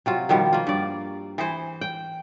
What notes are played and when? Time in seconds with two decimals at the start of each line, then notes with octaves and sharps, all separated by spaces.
0.06 C3 F#3 F4
0.29 B2 D#3 F3 G3
0.53 A#3 F4
0.67 G2 D5
1.38 E3 G#4 C5
1.81 G5